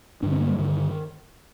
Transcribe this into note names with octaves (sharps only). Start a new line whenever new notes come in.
G2 D3 D4
C4
A#3
G3
G2 D3 D#3